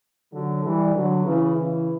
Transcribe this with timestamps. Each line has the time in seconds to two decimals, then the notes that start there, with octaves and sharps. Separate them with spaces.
0.33 D3 F#3
0.63 E3 G3
0.95 D3 F#3
1.25 C#3 E3
1.56 C#3 E3